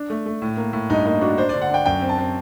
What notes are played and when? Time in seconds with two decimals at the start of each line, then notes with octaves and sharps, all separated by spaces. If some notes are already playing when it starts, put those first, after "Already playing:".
Already playing: D4
0.10 A3
0.26 A3
0.42 A2
0.57 A#3
0.73 A2
0.89 G2 D#4
1.06 A#3 D#4
1.21 D4 F#4
1.37 D4 C5
1.49 D3 D5
1.62 F#5
1.70 D4 G5
1.86 F#2 G5
2.02 C4
2.09 A5
2.18 C4